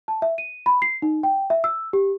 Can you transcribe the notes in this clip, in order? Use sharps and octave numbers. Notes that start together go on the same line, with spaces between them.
A5
E5
D#7
B5
C7
D#4
G5
E5
E6
G4